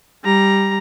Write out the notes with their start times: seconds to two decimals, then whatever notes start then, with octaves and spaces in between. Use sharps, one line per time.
0.24 G3 A#5